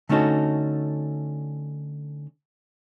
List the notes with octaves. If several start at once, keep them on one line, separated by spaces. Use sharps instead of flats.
D3 A3 C#4 D#4 F#4 A4